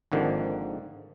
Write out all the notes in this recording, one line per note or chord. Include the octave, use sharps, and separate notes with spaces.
G#1 G#2 D3 D#3 F3 A#3